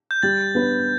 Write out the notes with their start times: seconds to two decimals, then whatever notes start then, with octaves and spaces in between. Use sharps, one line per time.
0.11 G6
0.23 G3 A6
0.55 B3 D4 B4